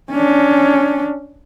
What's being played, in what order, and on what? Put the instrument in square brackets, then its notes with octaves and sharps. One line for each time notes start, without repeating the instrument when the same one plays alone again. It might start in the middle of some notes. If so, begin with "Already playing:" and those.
[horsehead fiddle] C#4 D4